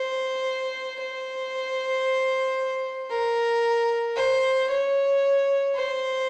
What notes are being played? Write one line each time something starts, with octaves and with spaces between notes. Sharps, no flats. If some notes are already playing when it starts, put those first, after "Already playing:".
Already playing: C5
C5
A#4
C5
C#5
C5